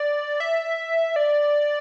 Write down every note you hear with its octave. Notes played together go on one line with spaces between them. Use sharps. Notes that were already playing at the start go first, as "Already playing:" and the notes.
Already playing: D5
E5
D5